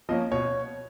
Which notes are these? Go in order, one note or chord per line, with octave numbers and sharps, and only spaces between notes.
F3 A#3 C#4 D#5
B2 C#5